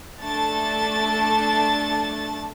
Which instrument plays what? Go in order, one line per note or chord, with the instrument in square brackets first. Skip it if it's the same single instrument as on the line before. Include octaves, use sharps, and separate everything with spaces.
[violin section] A3 D4 A4 A5 A6